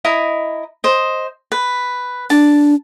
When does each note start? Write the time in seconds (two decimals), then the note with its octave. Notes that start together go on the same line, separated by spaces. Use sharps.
0.05 E4 D#5 A#5
0.84 C5 D#5
1.52 B4
2.30 D4 A5